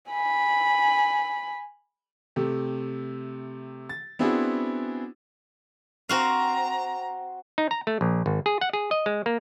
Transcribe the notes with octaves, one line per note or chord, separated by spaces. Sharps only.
G#5 B5
C3 A3 G4
A6
B3 C4 D4 E4 F#4 G#4
C4 F#4 F5 A#5
D#4
A#5
A3
A#1
G#1
G#4
F#5
G#4
D#5
G#3
A#3